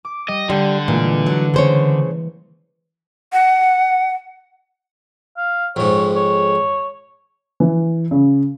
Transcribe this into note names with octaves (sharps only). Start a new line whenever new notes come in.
D6
G3 D#5
D3 G3 C6 G6
A#2 E3 G#3 A#3
F#3
C#3 C5 C#5
F#5
F5
F2 G#2 C#5
C#5
E3
C#3